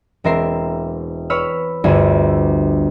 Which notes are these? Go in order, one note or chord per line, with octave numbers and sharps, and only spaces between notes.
E1 C4 A#4 E5 C7
B4 C#5 B5 E6 F6
G1 D2 D4 G#4 E5 G#6